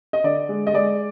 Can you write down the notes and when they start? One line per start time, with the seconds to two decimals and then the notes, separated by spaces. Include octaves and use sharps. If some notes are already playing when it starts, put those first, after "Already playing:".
0.13 D#5
0.24 D3 D5
0.49 G#3
0.67 D#5
0.74 G#3 D5